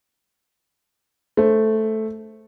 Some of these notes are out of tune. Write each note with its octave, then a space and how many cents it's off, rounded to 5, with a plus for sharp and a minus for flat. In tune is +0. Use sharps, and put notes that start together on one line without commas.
A3 -5 C5 +0